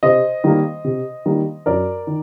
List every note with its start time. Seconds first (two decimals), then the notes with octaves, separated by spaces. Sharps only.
0.03 C3 C5 D#5
0.44 D#3 G3 A#3
0.84 C3
1.25 D#3 G3 A#3
1.66 F#2 A#4 D5
2.07 D#3